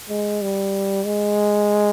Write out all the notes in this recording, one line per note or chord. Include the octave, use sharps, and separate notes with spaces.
G#3
G3
G#3